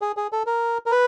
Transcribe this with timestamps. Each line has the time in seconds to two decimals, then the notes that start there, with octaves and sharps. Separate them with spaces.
0.01 G#4
0.17 G#4
0.32 A4
0.47 A#4
0.86 A#4
0.92 B4